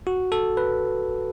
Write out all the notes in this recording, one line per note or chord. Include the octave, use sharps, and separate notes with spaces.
F#4
A4
B4